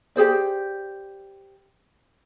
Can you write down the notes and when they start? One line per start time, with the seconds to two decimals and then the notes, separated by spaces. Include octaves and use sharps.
0.16 G4 G#4 C5 D5